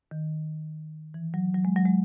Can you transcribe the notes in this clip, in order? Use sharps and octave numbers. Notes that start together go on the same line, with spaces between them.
D#3
E3
F#3
F#3
G#3
F#3
G#3